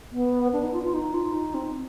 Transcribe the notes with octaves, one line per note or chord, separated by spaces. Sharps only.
B3
D4
D#4
F4
F4
D#4
F4
D#4
C4